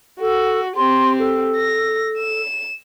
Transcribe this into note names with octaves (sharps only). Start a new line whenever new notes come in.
F#4 A4
C4 G4 C6
A4
A#6
E7